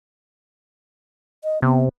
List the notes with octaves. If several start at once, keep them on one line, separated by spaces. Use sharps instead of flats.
D#5
C3 B3